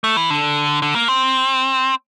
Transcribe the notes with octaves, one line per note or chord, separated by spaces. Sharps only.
A3
E3
D3
D3
A#3
C4